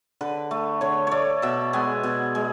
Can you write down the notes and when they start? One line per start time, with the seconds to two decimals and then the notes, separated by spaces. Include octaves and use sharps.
0.21 D3 B4
0.51 A3
0.81 D3 C#5
1.07 A3 C#5 D5
1.42 B2 E5
1.73 G#3 B3 G#5
2.03 B2
2.35 G#3